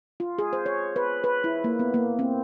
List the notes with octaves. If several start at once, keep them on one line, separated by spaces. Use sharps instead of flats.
F4
G#4
C5
C#5
B4
B4
E4
A#3
B3
A#3
C4